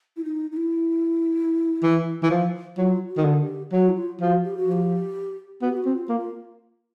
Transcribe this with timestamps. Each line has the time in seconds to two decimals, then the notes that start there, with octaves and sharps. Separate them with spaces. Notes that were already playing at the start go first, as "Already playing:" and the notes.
0.17 E4
0.24 D#4
0.52 D#4
0.57 E4
1.83 E3
2.23 E3
2.31 F3
2.77 F#3 F4
3.09 F#4
3.17 D#3
3.25 D3
3.41 G4
3.72 F#3 F#4
3.88 E4
3.96 F4
4.20 F3 F#4
4.44 G4
4.57 F#4
4.67 F3 G4
5.62 B3 F#4
5.69 G4
5.77 F#4
5.85 C4
5.93 F4
6.09 A#3
6.17 F4